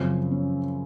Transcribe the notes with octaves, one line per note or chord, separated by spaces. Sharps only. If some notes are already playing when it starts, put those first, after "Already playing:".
Already playing: F#2 C#3 F3 C4
C#4